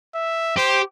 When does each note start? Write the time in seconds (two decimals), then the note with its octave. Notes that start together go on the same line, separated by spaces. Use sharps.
0.14 E5
0.57 G4 C5